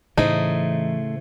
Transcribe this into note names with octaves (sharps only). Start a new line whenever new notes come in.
A2 C#3 E3 A3 D#4 C5